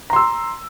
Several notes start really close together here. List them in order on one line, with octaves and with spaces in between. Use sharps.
A#5 C6 E6